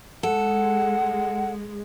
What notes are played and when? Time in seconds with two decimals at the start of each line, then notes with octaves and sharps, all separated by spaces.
0.23 G#3 A4 F#5